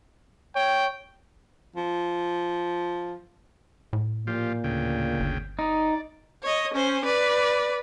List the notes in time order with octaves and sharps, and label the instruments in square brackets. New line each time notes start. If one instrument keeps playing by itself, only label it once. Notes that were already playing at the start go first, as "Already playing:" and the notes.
[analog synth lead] C#5 [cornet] G5
[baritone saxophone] F3
[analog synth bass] A2
[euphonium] A#2 [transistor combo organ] F3 F4 G4
[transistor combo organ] D2 C#3 G5
[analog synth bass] G1
[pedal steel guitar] D#4 [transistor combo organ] D5
[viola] C#5 D#5
C#4 C5
B4 D5